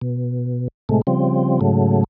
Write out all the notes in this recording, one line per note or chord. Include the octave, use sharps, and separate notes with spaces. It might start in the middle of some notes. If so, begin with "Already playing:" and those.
B2
A2 C3 G#3 A3
C#3 F3 G3 C4
G#2 C#3 F#3 A3